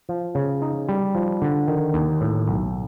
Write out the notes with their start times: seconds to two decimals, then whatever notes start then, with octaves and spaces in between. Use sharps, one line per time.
0.09 F3
0.35 C#3
0.62 D#4
0.89 G3
1.15 F3
1.42 D3
1.68 D#3
1.94 D#2
2.21 A2
2.47 B1